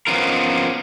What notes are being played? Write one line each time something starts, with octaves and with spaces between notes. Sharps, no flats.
F3 B3 C#4 D#4 F4 A#4